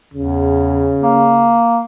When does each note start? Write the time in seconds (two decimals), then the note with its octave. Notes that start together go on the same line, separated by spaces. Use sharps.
0.14 E2 C#3
1.02 A#3